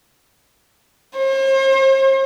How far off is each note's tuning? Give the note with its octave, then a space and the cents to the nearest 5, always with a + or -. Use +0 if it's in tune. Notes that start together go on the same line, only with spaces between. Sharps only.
C5 +40